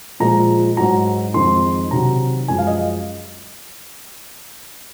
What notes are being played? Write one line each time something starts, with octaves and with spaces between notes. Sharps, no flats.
A#2 F3 G#3 A#5
G#2 F#3 A#5
F2 D#3 G#3 C6
C3 D#3 F#3 A#5
F#2 F3 G#3 G#5
F5
D#5